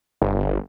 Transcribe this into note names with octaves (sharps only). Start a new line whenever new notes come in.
G1